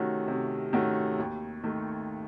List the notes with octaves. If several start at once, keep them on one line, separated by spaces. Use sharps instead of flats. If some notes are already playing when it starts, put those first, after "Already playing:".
Already playing: C3 D#3 A3 C#4 F#4
C3
D#3 A3 C#4 F#4
D#2
D#3 A3